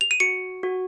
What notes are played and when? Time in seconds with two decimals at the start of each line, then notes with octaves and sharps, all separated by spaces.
0.01 F7
0.11 D#7
0.20 F#4 C#7
0.63 F#4